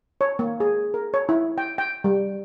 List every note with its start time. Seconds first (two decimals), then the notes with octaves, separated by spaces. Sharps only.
0.21 C#5
0.39 A#3
0.60 G#4
0.94 A#4
1.14 C#5
1.29 E4
1.58 G5
1.78 G5
2.04 G3